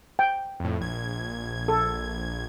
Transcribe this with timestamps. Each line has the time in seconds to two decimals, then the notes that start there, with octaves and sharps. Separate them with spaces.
0.19 G5
0.60 F2 A2
0.80 A#1 G#6
1.68 A4